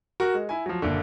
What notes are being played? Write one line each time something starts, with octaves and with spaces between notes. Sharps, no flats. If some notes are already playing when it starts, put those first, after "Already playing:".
F#4 A#4
G#3
E4 G#5
F3 F#3
F#1 A#2 D3